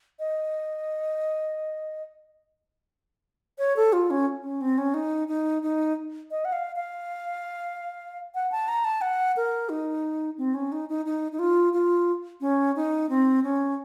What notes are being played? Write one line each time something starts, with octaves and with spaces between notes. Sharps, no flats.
D#5
C#5
A4
F4
C#4
C#4
C4
C#4
D#4
D#4
D#4
D#5
F#5
F5
F5
F#5
A5
A#5
A5
F#5
A#4
D#4
C4
C#4
D#4
D#4
D#4
D#4
F4
F4
C#4
D#4
C4
C#4